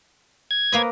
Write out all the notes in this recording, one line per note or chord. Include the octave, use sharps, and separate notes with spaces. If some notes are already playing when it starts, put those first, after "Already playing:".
G#6
A#3 B4 D#5